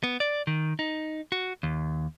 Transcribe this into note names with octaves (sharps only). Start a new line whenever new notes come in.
B3
D5
D#3
D#4
F#4
D#2